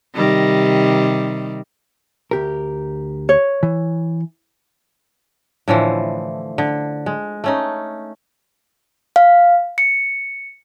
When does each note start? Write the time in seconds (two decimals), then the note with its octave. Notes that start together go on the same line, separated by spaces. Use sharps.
0.15 C3 D#3 G3
2.31 D2 G4 A#4
3.29 C#5
3.63 E3
5.68 A2 D3 E3 F3
6.58 D3
7.06 G#3
7.44 A3 C#4 D#4
9.16 F5
9.78 C#7